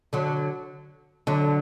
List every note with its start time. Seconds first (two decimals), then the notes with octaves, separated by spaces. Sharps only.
0.13 D3 F#3
1.27 D3 F#3